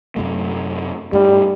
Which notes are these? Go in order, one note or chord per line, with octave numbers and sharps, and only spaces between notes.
F#2 C3 A3
G2 G3 A3